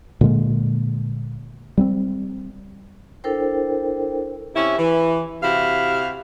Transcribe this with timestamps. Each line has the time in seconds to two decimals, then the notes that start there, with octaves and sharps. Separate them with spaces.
0.21 A#2 D3 G#3 A#3
1.78 G3 B3 C4
3.24 D4 E4 A4 A#4 C5 G5
4.55 C3 C#4 E4
4.79 E3
5.42 C3 E4 F#4 F5